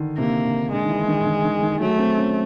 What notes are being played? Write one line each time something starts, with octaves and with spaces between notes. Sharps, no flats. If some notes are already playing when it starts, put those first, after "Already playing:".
Already playing: D3 D#3
C3 A#3
D3
D3 G#3
D#3
E3
D#3
D3
D#3
D#3
D#3
F#3 A3
C4
C#4